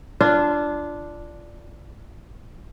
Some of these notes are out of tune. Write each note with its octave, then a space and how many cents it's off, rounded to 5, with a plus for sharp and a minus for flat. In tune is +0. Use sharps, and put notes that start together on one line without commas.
D4 +0 F4 -25